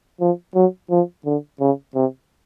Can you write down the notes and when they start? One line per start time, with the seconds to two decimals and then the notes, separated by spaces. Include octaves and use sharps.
0.21 F3
0.55 F#3
0.90 F3
1.26 D3
1.60 C#3
1.95 C3